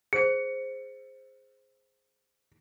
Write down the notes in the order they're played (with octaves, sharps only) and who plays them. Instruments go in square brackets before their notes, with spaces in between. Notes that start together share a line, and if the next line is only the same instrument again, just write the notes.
[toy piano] G#4 C5 [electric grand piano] C#7